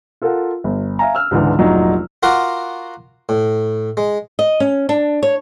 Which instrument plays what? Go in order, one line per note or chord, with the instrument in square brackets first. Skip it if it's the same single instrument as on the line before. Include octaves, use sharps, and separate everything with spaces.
[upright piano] F4 A4 A#4 F5 F#5
G1
E5 F5 G#5 A#5
E6 F6
C#2 G#2 D3 E3
F1 A#1 F#3 D#4 F4 A#5
[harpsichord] F4 F#4 A#4 F#5 C6 D6
A2
G#3
[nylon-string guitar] D#5
C#4
D4
C#5